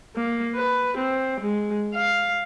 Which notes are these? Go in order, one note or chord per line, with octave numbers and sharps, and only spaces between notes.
A#3
B4
C4
G#3
F5